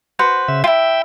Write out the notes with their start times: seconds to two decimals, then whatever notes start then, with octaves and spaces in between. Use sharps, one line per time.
0.19 F#4 B4 C5
0.48 C#3 E5
0.64 E4 F4 E5 G5